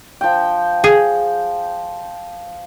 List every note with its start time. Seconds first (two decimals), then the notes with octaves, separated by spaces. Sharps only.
0.21 F3 G5
0.84 G#4